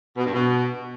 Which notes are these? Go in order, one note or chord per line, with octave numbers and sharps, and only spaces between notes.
B2
G2
B2